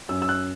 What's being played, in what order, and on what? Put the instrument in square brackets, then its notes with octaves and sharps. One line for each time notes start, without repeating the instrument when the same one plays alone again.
[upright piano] F#2 E6
E6
F#6